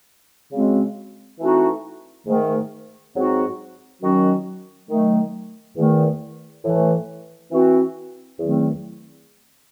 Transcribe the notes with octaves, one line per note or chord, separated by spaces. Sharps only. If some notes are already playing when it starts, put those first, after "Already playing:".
C#3 G#3 C4 F#4
E3 A3 C4 D#4 F#4
G#2 D#3 A3
G#2 F#3 C4 D#4 F#4
D#3 F#3 C#4 F#4
D#3 F#3 A3
E2 D#3 A3
A2 E3 A3
E3 C4 F#4
E2 D#3 F#3 A3 C4